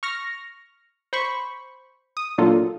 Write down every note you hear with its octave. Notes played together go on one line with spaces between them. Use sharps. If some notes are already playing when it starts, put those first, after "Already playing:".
C#6 F6 A#6
C5 B5 C#6
D#6
A#2 F#3 A#3 D4 F4 A4